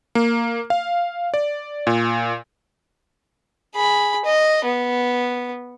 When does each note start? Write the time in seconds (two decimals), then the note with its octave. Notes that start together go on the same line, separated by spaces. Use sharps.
0.15 A#3
0.70 F5
1.34 D5
1.87 A#2
3.75 G#4 B5
4.25 D#5
4.65 B3